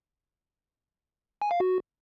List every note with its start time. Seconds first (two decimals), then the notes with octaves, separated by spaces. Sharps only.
1.42 G#5
1.51 F5
1.60 F#4